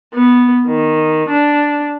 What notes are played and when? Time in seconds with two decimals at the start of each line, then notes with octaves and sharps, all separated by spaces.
0.14 B3
0.67 D#3
1.29 D4